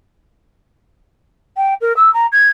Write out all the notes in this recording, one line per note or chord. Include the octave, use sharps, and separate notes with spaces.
G5
A#4
E6
A#5
G#6